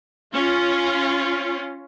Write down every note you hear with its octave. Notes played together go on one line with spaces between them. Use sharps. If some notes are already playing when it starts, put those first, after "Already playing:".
C#4 F4